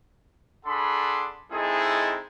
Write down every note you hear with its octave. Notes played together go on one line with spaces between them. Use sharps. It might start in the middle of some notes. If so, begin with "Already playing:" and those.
D4 G#4 A4 F#5 B5 C6
G#3 C4 D#4 E4 G#4 A4